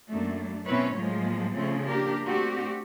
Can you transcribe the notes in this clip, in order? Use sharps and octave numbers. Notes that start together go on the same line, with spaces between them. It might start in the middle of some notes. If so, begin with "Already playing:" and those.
F#2 A3 A#3 D4
B2 C4 C#4 E4 B4 C#5
A2 F3 F#3 G#3 A#3
C#3 F3 A3 C4 C#4
A#3 D4 G4 A#4
A3 C4 D4 F#4 G4